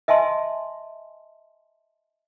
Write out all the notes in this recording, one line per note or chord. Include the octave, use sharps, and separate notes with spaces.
D#5 E5 G#5 A5 C6